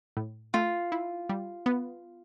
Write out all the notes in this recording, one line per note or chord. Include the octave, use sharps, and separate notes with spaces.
A2
A3 F4
E4
G3
B3